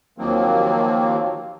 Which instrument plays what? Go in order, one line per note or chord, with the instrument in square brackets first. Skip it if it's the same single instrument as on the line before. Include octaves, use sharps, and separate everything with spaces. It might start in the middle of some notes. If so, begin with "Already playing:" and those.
[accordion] D#2 D#3 F3 F#3 A#3 C4